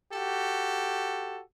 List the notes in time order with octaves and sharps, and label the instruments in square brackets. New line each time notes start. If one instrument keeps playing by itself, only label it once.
[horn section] F#4 G4 A4